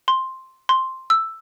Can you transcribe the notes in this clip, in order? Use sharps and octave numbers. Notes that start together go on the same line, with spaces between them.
C6
C6
E6